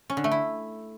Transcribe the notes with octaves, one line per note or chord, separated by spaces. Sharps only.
C#4
D3
A3
E4